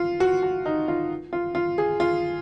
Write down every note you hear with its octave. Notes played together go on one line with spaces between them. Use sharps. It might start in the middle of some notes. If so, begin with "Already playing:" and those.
Already playing: F4
F#4
F#4
D#4
F4
F4
F4
G#4
F4